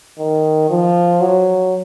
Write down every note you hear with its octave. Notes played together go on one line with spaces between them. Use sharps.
D#3
F3
F#3